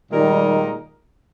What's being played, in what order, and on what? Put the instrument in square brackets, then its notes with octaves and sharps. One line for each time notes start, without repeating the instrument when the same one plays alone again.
[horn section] A#2 G#3 D#4 A#4 D#5 [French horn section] D#3 G3